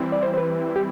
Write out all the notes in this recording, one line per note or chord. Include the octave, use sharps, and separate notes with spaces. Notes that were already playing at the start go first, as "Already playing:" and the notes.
Already playing: E3 G3 C4 E4
D5
C5
C5
B4
G4